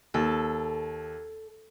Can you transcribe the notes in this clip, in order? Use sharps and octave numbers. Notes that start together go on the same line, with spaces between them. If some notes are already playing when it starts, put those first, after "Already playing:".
D#2 A4